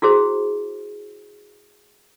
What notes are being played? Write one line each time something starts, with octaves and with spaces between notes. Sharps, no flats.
E4 F#4 G#4 C5